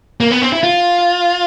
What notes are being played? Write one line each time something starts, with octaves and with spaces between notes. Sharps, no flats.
A#3
B3
C4
E4
F4